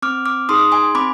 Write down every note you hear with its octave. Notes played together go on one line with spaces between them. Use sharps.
C4 D6 F6
D6 F6
D#4 G#4 C6 D#6
G#5 C6
C4 B5 D6